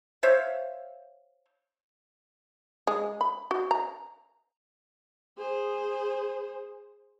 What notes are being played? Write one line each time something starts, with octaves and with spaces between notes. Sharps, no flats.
C5 C#5 E5 F5
G#3
B5
F#4
A#5
G#4 C5